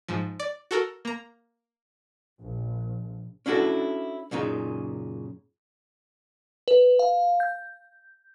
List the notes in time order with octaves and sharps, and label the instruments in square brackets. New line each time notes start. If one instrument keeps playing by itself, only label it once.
[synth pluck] G#2 F3
D5
F#4 A4 A#4
A#3 A#5
[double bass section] A#1
[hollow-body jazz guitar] C#4 D4 E4 F#4 A4
F#2 A#2 C#3 D#4
[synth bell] B4
F5
G6